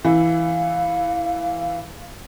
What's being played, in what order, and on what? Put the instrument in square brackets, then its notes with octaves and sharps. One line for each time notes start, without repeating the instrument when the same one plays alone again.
[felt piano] E3 E4 [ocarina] F5